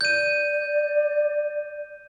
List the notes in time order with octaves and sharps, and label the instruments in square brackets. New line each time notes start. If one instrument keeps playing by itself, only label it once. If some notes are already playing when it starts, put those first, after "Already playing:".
[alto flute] D5 [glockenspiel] G6 D#7